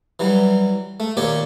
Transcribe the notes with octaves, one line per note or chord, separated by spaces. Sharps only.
E3 F#3 G3
A3
D#2 A#2 G4 C#5 D5